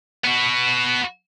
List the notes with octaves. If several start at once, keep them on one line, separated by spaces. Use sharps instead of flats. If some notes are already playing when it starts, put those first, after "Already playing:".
B3 F#4